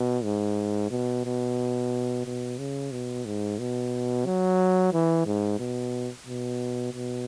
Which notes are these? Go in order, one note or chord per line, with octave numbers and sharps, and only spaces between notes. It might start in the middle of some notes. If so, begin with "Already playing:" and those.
Already playing: B2
G#2
B2
B2
B2
C#3
B2
G#2
B2
F#3
E3
G#2
B2
B2
B2